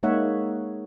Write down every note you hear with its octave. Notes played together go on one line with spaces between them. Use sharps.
G#3 A#3 D#4 C#5 E5 F#5